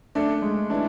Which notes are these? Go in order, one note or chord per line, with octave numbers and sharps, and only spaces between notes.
A3 D4 A4
G#3
E3 D4 E4